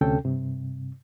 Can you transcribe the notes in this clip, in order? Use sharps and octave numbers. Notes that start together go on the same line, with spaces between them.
D2 C3 C#4 A4 G5
G2 C3